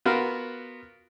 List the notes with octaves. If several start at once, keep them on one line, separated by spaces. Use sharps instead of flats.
B3 F4 F#4 A#4